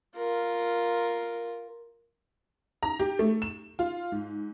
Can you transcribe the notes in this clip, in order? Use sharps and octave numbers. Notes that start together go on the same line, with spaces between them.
F4 A#4
A#5
G4
A3
E7
F4
G#2